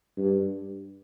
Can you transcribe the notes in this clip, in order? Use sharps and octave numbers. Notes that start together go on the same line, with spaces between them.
G2